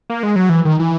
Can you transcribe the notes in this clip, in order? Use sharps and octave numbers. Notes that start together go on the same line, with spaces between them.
A#3
G#3
F#3
E3
D#3
E3